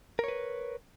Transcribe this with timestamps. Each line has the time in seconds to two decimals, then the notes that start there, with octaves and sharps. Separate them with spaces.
0.19 A#4
0.24 C#5
0.28 B4